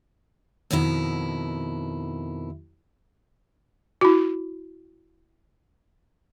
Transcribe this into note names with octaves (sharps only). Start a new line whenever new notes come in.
F2 B2 D#3 E4
E4 F#4